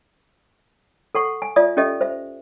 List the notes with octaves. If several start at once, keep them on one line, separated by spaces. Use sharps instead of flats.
A4 F#5 C#6
G#5
F4 D5 E5 D#6
C#4 G4 A4 D#5 E5
C5 E5